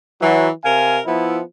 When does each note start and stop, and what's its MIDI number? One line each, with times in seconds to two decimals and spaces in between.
0.20 0.48 52
0.20 0.48 54
0.64 1.00 48
0.64 1.00 70
0.64 1.00 77
0.64 1.00 80
1.06 1.39 53
1.06 1.39 59
1.06 1.39 64